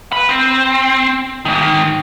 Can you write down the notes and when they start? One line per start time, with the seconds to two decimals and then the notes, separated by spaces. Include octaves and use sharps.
0.12 B4 B5
0.29 C4
1.45 G#2 D#3